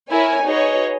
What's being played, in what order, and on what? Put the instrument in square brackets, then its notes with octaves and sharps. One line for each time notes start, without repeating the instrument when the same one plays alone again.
[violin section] E4 A#4 C#5 G#5
D#4 F#4 G#4 B4 C#5 D#5